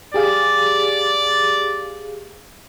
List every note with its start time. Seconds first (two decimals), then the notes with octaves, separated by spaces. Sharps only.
0.14 G4 G#4 D5 F5